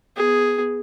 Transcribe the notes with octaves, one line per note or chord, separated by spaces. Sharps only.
B3 G#4